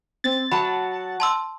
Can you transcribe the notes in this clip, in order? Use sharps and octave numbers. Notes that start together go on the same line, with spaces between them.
C4 A6
F#3 F#5 A5 B5
A5 C6 E6